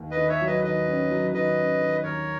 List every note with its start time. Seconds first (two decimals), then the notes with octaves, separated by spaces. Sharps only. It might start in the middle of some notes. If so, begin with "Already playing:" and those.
Already playing: D#2
0.11 B4 D#5
0.17 D#3
0.29 C#5 E5
0.41 F#3
0.47 B4 D#5
0.63 D#3 B4 D#5
0.88 C#4
1.11 F#3
1.34 D#3 B4 D#5
1.57 C#4
1.81 D#3
2.03 D#2 A#4 C#5